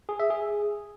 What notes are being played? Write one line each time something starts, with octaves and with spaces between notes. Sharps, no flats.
G#4
E5
G#4